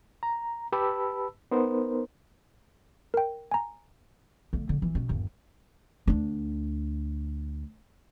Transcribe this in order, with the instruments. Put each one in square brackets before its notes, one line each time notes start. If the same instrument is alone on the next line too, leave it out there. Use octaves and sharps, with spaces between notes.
[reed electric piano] A#5
G4 B4 A5 B5 E6
B3 D#4 A#4 C5
[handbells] A#4 G5
G#5 A#5
[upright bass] D3 A3
D3
E3
B2 C#4
G1 D#2
D2 D4